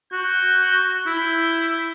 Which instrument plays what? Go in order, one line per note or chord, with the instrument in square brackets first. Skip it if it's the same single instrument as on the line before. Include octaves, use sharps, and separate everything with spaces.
[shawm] F#4 [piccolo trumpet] G6
[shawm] E4 [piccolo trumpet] G6